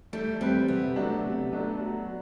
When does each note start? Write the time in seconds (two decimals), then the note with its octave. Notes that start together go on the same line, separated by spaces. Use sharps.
0.13 G3 A3
0.41 G3 C4 G4 B4
0.68 C3 B3
0.96 F#3 A3 D4
1.24 C3
1.52 F#3 A3 D4
1.80 F#3